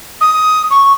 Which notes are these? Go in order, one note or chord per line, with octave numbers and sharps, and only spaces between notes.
D#6
C#6